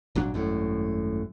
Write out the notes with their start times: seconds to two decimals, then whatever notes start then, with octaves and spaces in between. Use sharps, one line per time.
0.15 G#1 A#2 F#3 D4
0.34 G#1 F#2 A2